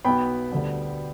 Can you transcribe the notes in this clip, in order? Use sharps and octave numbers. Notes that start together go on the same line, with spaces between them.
B1 B2 B3 G5 B5
D2 D3 G3 B3